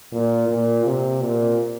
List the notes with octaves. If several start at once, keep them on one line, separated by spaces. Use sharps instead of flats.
A#2
A#2
C3
A#2